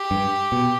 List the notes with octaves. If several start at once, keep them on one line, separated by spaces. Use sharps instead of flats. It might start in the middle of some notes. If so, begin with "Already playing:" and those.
Already playing: G4
G2
B2